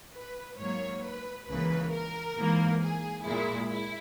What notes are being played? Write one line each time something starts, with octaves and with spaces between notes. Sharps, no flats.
B4
G#2 F#3 A#3 C#5
B4
C#2 C#3 E3 A#3 B4
A#4
G#2 E3 A#3
G#4
A#2 G#3 E4
E4